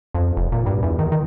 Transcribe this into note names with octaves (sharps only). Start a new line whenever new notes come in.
F2
F1
A#2
G2
E2
D#3
D#3